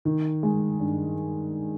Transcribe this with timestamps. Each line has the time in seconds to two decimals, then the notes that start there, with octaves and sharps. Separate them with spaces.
0.05 D#3
0.43 G#3
0.79 G2